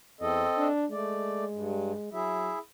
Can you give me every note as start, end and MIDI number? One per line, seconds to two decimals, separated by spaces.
0.21 0.44 40
0.21 0.68 60
0.21 0.68 69
0.21 0.68 75
0.58 0.86 62
0.91 2.11 56
0.91 1.44 57
0.91 1.44 74
1.51 1.92 43
2.13 2.51 54
2.13 2.59 64
2.13 2.59 68
2.13 2.59 76